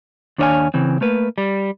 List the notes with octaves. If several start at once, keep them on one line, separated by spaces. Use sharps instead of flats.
D#2 D4 C#5 D#5 F5 G#5
C#3 E3 C4
A3 A#3 B4
G3